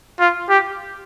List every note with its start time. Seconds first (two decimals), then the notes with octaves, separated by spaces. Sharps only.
0.19 F4
0.49 G4